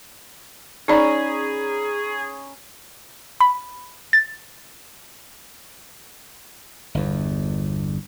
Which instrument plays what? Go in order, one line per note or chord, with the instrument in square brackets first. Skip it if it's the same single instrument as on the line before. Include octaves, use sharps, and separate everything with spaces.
[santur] C#4 A#5 B5 [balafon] D#4 D5 [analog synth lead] G#4
[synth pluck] B5
A6
[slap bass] G1 E2